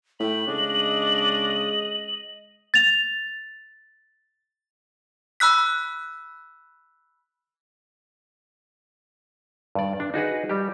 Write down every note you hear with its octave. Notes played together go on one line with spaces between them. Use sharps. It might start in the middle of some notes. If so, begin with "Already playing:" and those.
A2 G5 B5 F#7
C#3 G#3 D4 G#4 D#5
A6 F7
B5 E6 F#6 B6
G2 D5
D4
D#4 F#4 G#4 B4
G3 G4